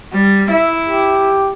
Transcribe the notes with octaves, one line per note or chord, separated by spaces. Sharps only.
G3
E4 E5
G4